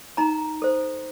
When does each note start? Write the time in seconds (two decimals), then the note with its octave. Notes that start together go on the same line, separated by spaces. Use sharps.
0.17 D#4 A#5
0.62 A4 C5